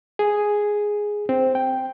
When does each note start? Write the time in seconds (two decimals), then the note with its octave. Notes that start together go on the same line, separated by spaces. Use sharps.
0.19 G#4
1.29 C4
1.55 G5